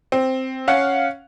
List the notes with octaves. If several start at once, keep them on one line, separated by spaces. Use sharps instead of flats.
C4
C#4 F5 F#5